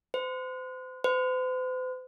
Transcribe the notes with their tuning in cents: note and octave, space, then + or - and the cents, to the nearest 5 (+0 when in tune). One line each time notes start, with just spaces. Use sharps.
C5 -35
C5 -45